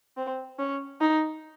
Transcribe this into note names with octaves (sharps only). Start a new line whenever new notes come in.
C4
C#4
D#4